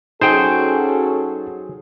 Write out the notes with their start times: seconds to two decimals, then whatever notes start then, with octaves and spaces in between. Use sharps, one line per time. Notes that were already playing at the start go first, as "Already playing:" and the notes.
0.21 F#3 C#4 D#4 F#4 G#4 A4 C5 G5